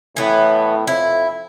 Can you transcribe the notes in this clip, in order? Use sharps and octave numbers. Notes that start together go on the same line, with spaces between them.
A2 E3 B3
F2 E4